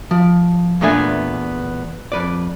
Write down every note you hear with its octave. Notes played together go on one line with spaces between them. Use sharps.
F3
E2 A#2 A3 B3 D4 G#5
F2 B4 D5